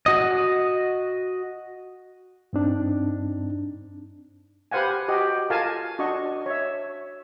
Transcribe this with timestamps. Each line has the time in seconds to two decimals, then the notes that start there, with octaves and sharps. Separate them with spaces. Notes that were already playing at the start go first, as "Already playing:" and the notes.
0.06 F#4 D#5
2.53 G2 C4 D4 D#4
4.71 G4 B4 C5 F5 F#5 G#5
5.08 F#4 G4 D#5
5.50 F4 A4 A#4 F5 G#5 A5
5.99 D4 F#4 D#5 C#6
6.46 C#5 E5